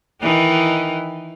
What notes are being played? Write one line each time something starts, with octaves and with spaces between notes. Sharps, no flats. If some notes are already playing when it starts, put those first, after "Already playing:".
D#3 E3 D#4